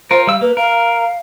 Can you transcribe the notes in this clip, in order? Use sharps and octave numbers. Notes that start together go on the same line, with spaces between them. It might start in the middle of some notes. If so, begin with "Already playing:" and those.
F4 A#4 C5
G3 F5 E6
A#3 B4
A#4 F5